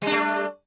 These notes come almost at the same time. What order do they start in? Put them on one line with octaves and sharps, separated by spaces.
G3 D4 A3